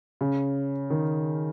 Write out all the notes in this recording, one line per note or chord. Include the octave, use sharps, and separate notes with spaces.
C#3
D#3